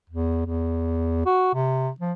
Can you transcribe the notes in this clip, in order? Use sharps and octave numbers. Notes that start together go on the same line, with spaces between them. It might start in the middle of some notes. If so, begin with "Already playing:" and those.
E2
E2
F#4
C3
F3